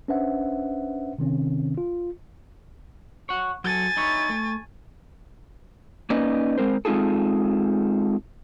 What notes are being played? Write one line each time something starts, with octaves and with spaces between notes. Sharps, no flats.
C#4 D4 B4 C5 E5 F#5
C3 D#3 C4 C#4
F4
C#5 F#5
F#3 A4 G#5 A6
D#4 E4 C#5
A3
A#3 C#4 D#4 B4 D5 D#5
G#3 C4 A#4 C5
G#3 C4 D#4 F4 G#4 A4